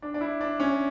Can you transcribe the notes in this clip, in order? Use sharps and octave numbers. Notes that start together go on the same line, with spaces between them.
D4
D4
E4
D4
C#4